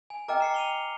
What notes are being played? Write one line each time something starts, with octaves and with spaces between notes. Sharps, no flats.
G#5
A#4 D#5 G5 A#5 D6 F6
A#5 C7 C#7
D#7 F7 G7